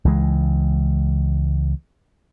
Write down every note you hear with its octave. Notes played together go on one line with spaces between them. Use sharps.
C#2 E3 G#3